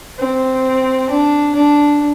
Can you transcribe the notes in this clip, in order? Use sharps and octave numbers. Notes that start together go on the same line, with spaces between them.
C4
D4
D4